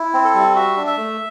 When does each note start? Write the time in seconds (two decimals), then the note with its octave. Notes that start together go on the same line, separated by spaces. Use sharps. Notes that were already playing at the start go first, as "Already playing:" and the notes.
Already playing: E4
0.14 C4
0.25 A4
0.35 G3
0.55 F#4 E5
0.77 D4
0.87 E5
0.97 A3